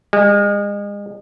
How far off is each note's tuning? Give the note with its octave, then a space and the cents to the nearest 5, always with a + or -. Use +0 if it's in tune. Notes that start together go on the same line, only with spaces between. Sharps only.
G#3 -35